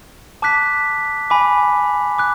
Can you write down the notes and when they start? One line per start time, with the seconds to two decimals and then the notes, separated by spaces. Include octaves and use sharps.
0.42 A5 D6 F#6 B6
1.30 G#5 B5 D6
2.19 D6 F#6